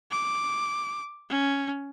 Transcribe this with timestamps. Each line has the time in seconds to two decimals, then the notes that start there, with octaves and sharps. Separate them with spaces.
0.11 D6
1.29 C#4